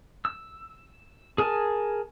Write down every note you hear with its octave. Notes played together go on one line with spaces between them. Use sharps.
E6
G#4 A#4 G#5 A5